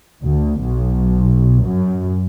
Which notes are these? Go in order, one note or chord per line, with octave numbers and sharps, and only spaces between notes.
D2
B1
F#2